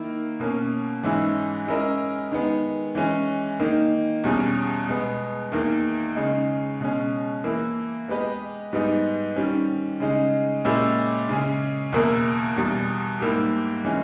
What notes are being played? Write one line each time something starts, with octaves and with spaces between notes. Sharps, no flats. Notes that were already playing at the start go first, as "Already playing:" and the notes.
Already playing: D#3 A#3 E4 A#4
B2 A#3 C#4
G#2 E3 G#3 C#4 E4
G#3 C#4 E4 A#4 D#5
D#3 G#3 B3
E3 G#3 C#4
D#3 A#3 D#4
E2 B2 G3 C#4 G#4
B2 G#3 B3
E2 D#3 A#3
C#3 G#3 D#4
B2 G#3 C#4
E3 A#3 E4
G#3 B3 G4 B4 D#5
G#2 G3 B3 D#4 G#4
D#3 G3 C#4
C#3 G#3 D#4
A#2 G#3 C#4 E4 G4
C#3 G#3 C#4 G#4
E2 B2 A#3 E4 A#4
E2 B2 G3
G#2 G3 A#3 E4 G4
E3 G#3 C#4